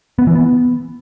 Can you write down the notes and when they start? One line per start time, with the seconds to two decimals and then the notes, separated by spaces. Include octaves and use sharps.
0.19 B3
0.27 E3
0.35 B3